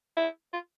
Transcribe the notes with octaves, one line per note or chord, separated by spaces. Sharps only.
E4
F4